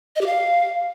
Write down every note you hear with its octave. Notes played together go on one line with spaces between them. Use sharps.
D#5
G4
F5